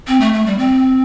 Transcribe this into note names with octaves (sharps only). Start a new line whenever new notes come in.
C4
A3
A3
G3
C4